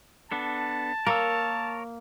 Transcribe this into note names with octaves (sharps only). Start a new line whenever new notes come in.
B3 D4 A4 A5
A#3 A#4 C#5 E6